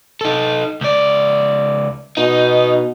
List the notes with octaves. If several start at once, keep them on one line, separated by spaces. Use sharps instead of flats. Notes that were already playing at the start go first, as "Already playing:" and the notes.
D#4 A4
C#2 D5
B2 D#4